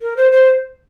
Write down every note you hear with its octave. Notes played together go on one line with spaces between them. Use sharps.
A#4
C5
C5